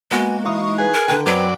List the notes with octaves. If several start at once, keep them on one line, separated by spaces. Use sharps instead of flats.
G#3 A#3 B3 F#4 F#5 G#5
E3 D#4 F5 C#6 D#6
G#4 B4 F#6
A#4
D3 D#3 B4 G5
F#2 F#3 C4 B4 D5